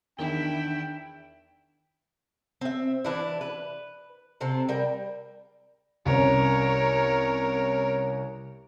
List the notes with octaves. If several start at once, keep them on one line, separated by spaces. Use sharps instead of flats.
E2 D#3 D4 E4 G5 G7
C4 E5
E3 D4 E4
B4
C3 C4 A4
G3 A#4 G5
C2 C#4 A#4 C#5